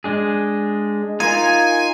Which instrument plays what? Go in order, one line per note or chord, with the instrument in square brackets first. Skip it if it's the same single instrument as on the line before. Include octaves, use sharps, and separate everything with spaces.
[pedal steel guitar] G#3 D4 G#4
[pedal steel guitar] D#4 F4 A#4 [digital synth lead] G#5